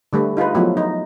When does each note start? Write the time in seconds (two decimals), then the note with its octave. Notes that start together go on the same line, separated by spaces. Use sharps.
0.13 D3 G3 A3 B4
0.37 D#4 F4 G#4 B4
0.55 F3 F#3 A3 B3 E4
0.77 D#4